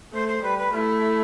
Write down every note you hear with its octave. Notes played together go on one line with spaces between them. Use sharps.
A3 C5
C5
G3 B4
B4
A3 E4 F4